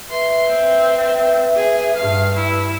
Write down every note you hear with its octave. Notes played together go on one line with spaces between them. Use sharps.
B4 E5 C6
C4
G#4
G2 F5
E4